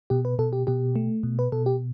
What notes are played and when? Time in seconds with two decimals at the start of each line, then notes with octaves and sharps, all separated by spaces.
0.10 B2 G4
0.25 B4
0.39 B2 A4
0.53 G4
0.67 B2 G4
0.96 A3
1.23 B2
1.39 B4
1.52 B2 A4
1.66 G4